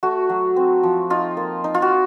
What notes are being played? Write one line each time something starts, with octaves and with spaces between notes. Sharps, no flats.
A3 F#4
F#3
C4
F3
D#4 F4
A#3
D#4
F4
F#4